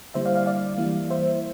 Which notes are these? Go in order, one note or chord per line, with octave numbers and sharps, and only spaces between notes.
D3 G3 A#3 E4 C5 E5
D5 F5
D5 F5
D5 F5
E3 G3 A#3 E4
C5 E5